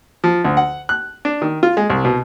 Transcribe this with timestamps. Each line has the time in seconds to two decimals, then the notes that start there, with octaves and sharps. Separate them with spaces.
0.24 F3
0.45 D2
0.57 F#5
0.89 F#6
1.25 D4
1.42 D#3
1.63 F4
1.77 G#3
1.90 C2
2.05 B2